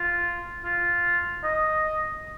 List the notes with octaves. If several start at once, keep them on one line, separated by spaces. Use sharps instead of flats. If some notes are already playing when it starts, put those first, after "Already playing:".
Already playing: F4
F4
D#5